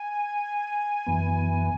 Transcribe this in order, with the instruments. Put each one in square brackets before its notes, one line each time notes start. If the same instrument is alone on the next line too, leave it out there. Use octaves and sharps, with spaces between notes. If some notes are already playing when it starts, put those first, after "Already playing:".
Already playing: [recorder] G#5
[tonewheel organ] F#2 E3 B3